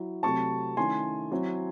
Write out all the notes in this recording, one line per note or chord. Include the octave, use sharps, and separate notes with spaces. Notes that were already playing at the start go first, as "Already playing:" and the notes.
Already playing: F#3 E4
C3 F#3 A3 C4 A5 C#6
D#3 A3 C#4 E4 G#5 C6
F#3 C4 E4